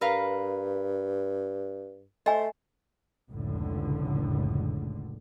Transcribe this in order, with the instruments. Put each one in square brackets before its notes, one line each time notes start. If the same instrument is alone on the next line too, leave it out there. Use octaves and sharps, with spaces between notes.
[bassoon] G2 [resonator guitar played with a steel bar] A#4 B4 F5
[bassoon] A3 [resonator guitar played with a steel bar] C5 [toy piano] D#5 G#5
[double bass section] F1 C#2 A2 D3